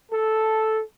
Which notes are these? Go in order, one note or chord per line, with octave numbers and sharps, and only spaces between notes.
A4